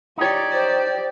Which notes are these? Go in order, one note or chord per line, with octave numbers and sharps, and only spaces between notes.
D#4 G4 C#5 D5
C5